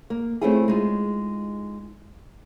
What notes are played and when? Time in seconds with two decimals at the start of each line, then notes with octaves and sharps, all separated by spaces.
0.10 A#3
0.41 A3 C4 C#4 E4 F4 G#4
0.68 G#3 D#4 F4